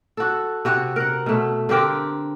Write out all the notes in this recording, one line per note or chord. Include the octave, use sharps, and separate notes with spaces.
F#4 A4
C3 F#4
A#4 F#5
B2 A3
D3 C4 G4 A#4